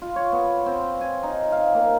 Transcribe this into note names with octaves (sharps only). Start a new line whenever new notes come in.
F4
C#5
B3
C4
G#5
D#4
F5
A#3